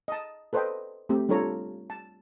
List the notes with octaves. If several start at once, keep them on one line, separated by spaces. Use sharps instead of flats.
D#5 A5
A4 B4 C5 D5 D#5 G5
A3 C4 G4
G3 D4 F4 A4 C#5 A#5
A5